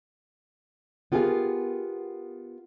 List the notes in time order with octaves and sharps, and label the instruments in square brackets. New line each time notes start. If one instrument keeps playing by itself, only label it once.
[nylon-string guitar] B3 F4 G4 G#4 A#4 F5